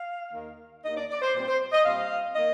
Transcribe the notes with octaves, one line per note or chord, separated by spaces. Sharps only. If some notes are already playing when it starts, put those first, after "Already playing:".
Already playing: F5
D#2 D#3 A#3
D#2 D#3 A#3 D#5
D5
D5
C5
A#2 G3 C4 C5
C5
D#5
A#2 G3 C4 F5
D#3 A#3 D#5